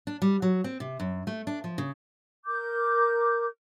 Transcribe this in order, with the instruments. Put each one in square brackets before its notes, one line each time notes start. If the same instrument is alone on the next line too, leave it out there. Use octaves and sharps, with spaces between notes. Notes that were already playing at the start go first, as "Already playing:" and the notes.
[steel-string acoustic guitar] D4
G3
F#3
C4
C3
F#2
A3
D4
F3
C#3
[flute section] A#4 D6 G6